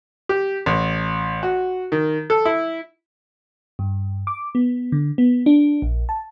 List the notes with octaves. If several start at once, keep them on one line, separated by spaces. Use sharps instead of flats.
G4
A1
F#4
D#3
A4
E4
G2
D6
B3
D3
B3
D4
A#1
A5